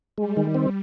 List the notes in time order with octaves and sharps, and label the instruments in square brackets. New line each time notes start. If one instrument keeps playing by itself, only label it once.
[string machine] G3 [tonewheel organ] G#3
[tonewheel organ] D#3
C4